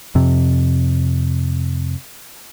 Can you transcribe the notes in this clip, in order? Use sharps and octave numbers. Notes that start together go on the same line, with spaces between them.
F2 C3